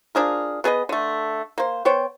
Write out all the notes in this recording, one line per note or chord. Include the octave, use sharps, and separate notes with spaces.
F3 D4 G#4 A#4
B3 G#4 B4 D#5
D3 A3
A#3 C5
B3 C5 C#5 G5